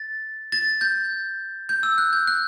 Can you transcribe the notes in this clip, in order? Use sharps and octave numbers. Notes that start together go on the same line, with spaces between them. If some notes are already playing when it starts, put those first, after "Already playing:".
Already playing: A6
A6
G6
G6
E6
F#6
G6
F#6